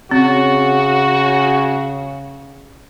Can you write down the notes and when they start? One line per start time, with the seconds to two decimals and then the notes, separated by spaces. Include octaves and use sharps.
0.11 C#3 C4 F#4